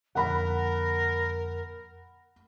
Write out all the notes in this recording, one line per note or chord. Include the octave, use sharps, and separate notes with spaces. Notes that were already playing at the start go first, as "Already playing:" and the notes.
F2 A#2 D3 A#4 F#5 B5